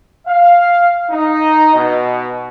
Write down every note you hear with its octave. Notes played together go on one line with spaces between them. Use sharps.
F5
D#4
B2